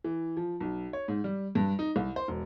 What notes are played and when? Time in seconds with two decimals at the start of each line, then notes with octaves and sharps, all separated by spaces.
0.04 E3
0.37 F3
0.60 B1
0.93 C#5
1.08 G#2
1.24 G3
1.55 G2
1.79 D#4
1.96 C2
2.16 C5
2.28 E1